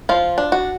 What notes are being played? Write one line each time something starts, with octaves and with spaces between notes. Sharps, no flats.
F3 F4
D4
F#4